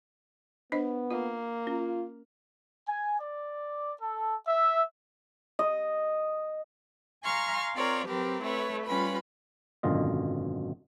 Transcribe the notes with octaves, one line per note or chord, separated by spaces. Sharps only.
B3 D4 C5 D#5
A#3 F4
C#4 F4
G#5
D5
A4
E5
D#5
F5 G#5 A#5 C6 C#6 F6
C4 F4 A#4 C#5 D5
F#3 C4 G4 A#4 B4
A3 E4 B4 C#5
G3 C#4 F4 B4 B5
G#1 F#2 B2 D3 F4 D#5